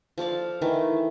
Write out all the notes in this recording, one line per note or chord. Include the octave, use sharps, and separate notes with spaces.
F3 A4 D5 F5
D#3 E3 A3